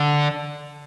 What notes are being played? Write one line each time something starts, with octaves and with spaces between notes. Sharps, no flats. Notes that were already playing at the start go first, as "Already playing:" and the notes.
Already playing: D3